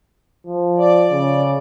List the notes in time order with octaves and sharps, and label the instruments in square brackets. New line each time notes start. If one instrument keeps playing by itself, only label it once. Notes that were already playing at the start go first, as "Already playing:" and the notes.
[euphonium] F3
[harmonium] D5
[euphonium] C#3